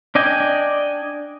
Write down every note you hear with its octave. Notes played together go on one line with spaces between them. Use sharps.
D4 D5 D#5 G5 G#5